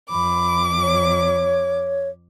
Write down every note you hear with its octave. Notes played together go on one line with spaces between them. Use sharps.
F2 B5 D6
C#5